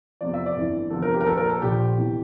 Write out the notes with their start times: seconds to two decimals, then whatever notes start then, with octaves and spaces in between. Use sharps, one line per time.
0.21 F1 E2 C3 F3 D5
0.34 E5
0.46 D5
0.56 G1 F2 E3
0.90 F1 E2 D3 F3 A4
1.02 A#4
1.14 G4
1.20 A#4
1.26 A#1 A#2 F3 A4
1.37 A#4
1.50 A4
1.61 A#1 A#2 F3 G4
1.97 F1 E2 E3